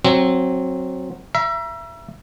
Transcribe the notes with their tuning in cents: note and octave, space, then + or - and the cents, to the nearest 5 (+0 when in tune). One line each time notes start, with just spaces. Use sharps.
F#3 +0 C4 +15
E5 +30 A#5 +40